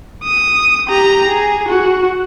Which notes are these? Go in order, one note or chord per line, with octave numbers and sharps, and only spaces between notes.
D#6
G4 A#5
G#4
F#4